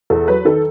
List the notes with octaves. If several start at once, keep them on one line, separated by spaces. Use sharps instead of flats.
E2 A4
F#3 B4
D#3 A4